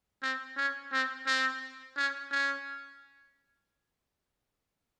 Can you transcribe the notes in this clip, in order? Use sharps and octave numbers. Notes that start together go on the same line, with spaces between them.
C4
C#4
C4
C4
C#4
C#4